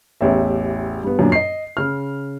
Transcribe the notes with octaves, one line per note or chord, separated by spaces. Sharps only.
A1 E2 G4 E5
G2 B3
F#2 A#2 F#3 D4
D#5 C7
C#3 F6